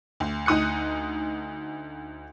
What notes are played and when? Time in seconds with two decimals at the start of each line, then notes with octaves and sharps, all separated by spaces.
0.20 D2
0.46 D2 D#4 D#6 F#6 C#7